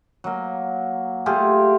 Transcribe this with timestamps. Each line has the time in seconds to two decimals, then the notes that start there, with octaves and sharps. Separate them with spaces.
0.24 F#3 A#3
1.26 A3 F4 G4 G#4